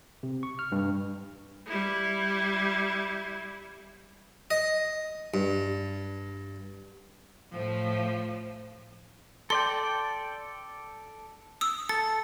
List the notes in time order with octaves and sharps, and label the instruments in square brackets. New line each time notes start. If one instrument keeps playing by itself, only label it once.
[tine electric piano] C3
C#6
F6
G2
[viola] G3 E4
[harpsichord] D#5
G2
[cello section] A2 F3
[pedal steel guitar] A4 D5 G5 [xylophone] C6
[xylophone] D#6 E6
[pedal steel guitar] A4 [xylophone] A6